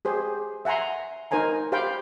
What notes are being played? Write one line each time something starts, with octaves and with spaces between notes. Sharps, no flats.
G4 G#4 C5
E5 F#5 G#5 A#5 C6
D#4 A#4 C5 G#5 A#5
G4 C5 F5 G5 B5